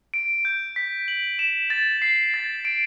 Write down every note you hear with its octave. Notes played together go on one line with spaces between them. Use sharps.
D7
G6
B6
F#7
E7
A6
C7
A6
D7